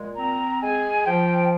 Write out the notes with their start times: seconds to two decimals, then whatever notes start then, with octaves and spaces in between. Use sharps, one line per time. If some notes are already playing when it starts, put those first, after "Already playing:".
Already playing: A#2 G#3
0.17 C4 A#5
0.61 G#3 G#5
1.06 F3 G5